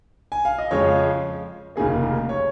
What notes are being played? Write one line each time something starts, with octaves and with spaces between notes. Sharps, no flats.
G#5
F5
D#5
F2 C#3 F3 G#3 C#5
F1 D#2 C#3 A#3 G#4
A#4
C#5